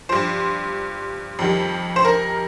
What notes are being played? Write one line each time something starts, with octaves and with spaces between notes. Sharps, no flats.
G2 F3 C5
F2 D#3 G3
C5
A#4